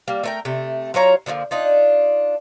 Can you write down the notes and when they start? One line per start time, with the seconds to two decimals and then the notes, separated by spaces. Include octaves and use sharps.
0.08 G3 A#3
0.23 A3 A#4 G5
0.45 C3 A3
0.94 F#3 F4 C#5 A#5
1.26 D3 F3 G#3 A#3
1.51 D4 D#4 F4